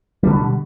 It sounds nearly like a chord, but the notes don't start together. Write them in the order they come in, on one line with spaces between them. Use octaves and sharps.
G3 D3 B2